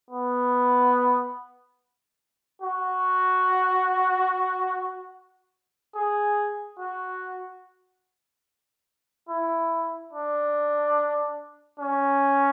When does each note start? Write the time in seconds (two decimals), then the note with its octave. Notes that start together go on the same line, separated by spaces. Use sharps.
0.11 B3
2.62 F#4
5.95 G#4
6.79 F#4
9.29 E4
10.13 D4
11.79 C#4